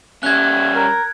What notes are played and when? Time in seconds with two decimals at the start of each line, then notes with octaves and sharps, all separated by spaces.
0.23 G3 C#4 E5 F#6 G#6
0.75 A#4